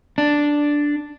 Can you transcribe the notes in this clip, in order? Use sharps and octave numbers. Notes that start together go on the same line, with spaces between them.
D4